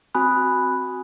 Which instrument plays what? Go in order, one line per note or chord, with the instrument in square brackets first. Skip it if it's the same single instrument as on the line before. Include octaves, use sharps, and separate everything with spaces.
[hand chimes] C4 F#4 G#5 B5 D#6 F#6